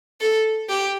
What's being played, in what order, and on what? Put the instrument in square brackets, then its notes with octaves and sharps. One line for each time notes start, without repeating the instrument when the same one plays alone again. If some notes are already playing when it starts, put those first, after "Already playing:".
[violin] A4
G4